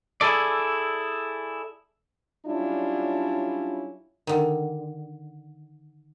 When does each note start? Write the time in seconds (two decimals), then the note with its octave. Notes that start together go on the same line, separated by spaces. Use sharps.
0.21 E4 G#4 A4 D5
2.46 F#3 G3 C#4 D4 E4 F4
4.27 D3 D#3